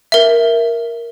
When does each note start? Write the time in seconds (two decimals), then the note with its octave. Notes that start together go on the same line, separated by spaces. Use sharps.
0.12 A#4 E5